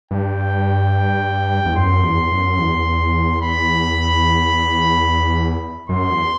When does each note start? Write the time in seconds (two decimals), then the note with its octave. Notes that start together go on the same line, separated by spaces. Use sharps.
0.11 G2 G5
1.65 E2
1.76 F#2 C6
2.03 E2
2.31 F#2
2.59 E2
3.42 B5
5.89 F#2 C6
6.10 E2